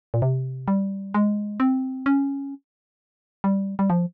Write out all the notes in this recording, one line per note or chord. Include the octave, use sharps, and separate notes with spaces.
A#2
C3
G3
G#3
C4
C#4
G3
G3
F3